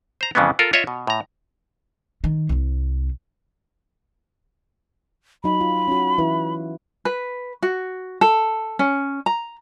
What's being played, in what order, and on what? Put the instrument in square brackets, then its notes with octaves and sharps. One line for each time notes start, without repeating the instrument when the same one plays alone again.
[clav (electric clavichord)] C5 A#5
F2 C#3 E3 G#3 B3
F4 A4 A#4
F4 C#5 D#5 E5
B2
A2 A#5
[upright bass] D#3
C2 C4
[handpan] F#3 D#4 [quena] B5
[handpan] F4
C#4 F#4
E3 E4 B4
[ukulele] B4
F#4
A4
C#4
A#5